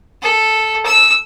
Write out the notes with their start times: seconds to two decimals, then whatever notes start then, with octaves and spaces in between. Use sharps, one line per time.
0.22 A4
0.86 E6